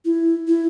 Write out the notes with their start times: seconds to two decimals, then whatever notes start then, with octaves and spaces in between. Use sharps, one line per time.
0.05 E4
0.47 E4